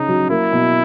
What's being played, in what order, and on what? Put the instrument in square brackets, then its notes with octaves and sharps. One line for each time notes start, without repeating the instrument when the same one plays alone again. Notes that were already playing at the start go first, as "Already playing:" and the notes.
Already playing: [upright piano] C#3 C#4 [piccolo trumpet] D#4
[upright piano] F#3
[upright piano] A#3 [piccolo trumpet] E4
[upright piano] B2